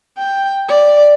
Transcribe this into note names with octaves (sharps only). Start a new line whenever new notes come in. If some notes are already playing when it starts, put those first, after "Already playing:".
G5
D5